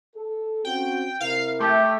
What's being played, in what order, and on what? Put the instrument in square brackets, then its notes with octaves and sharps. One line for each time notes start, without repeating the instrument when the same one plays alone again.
[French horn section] A4
[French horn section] C4 C#4 F#4 [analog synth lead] G5
[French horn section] C3 E4 A#4 [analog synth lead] F5
[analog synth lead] A3 [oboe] G4